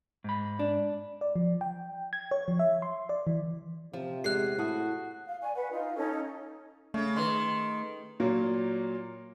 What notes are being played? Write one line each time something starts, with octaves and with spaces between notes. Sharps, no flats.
G#2 B5
D4
D5
F3
G5
G#6
C#5
F3
E5
C6
D5
E3
C3 F3
E2 G#3 G4 G#4 F6 F#6 C7
A2 E4 F#4 A5 D#6
F5
D5 G#5 C#6
B4 F#5
D#4 F4
C#4 D#4 A4
C#3 A3
D#3 B4 C6
A#2 F#3 A#3